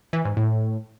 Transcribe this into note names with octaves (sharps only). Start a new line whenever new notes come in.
E3
G#2
A2